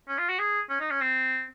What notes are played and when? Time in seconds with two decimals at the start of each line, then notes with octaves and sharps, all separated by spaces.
0.08 C#4
0.18 F4
0.29 F#4
0.39 G#4
0.70 C#4
0.80 D#4
0.91 C#4
1.01 C4